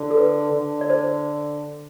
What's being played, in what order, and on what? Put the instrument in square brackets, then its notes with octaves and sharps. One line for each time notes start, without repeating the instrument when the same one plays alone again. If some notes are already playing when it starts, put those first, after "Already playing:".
Already playing: [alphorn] D3
[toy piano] A4
B4
[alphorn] D3
[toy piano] D5
C5